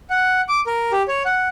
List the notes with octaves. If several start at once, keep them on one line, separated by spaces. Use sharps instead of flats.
F#5
D6
A#4
G4
C#5
F#5